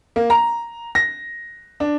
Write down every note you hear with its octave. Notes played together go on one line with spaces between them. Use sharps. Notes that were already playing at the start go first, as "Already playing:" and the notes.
A#3
A#5
A#6
D4